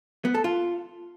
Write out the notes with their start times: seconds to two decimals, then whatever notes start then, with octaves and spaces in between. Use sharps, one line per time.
0.25 B3
0.35 A4
0.44 F4